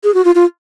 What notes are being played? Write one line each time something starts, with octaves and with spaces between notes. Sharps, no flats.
G#4
F#4
F4
F4